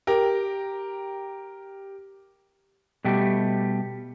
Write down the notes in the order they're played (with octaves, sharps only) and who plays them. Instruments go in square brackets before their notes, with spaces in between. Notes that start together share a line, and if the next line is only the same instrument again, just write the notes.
[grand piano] G4 A#4
[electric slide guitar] B2 G3 A3 G4